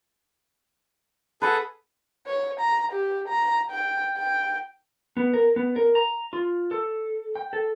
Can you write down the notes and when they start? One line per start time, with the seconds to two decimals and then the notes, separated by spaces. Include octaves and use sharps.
1.42 G#4 A4 B4 F#5
2.27 C#5
2.60 A#5
2.92 G4
3.28 A#5
3.71 G5
4.17 G5
5.17 B3
5.34 A#4
5.56 B3
5.76 A#4
5.95 A#5
6.33 F4
6.71 A4
7.35 G5
7.53 A4